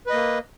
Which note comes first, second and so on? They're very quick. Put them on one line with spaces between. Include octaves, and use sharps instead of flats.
B4 D#5 A#3